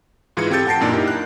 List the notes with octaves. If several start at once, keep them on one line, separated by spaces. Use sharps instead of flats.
G#2 E3 F4 G#4 G#6 C#7
C4 G4 A4 G6 A6
F#5 G5 A5 A#6 C7 D7
F#2 A#2 D4 D#4
D#4 E4 G4 A#4
F#6